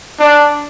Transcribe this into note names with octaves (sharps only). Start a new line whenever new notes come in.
D4